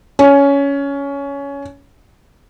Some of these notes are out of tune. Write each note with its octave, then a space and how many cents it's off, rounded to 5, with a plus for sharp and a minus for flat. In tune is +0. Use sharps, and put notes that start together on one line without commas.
C#4 +15